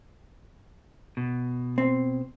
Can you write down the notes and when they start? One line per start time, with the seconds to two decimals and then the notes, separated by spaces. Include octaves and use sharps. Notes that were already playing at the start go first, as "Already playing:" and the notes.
1.17 B2
1.78 C4